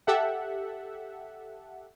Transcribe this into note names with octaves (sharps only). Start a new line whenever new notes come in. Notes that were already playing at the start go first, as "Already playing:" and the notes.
G4 A4 E5 F#5